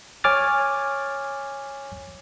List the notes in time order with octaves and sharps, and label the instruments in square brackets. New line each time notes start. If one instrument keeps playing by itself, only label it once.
[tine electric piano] C#5 G#5 D6 F6 A6